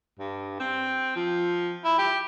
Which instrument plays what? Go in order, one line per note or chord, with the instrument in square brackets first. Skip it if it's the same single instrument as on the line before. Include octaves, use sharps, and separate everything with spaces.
[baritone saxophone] G2
C4
F3
E4
G4